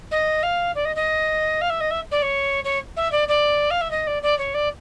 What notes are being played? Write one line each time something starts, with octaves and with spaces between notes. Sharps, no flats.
D#5
F5
D5
D#5
D#5
F5
E5
D#5
E5
D5
C#5
C#5
E5
D5
D5
F5
E5
D#5
D5
D5
C#5
D5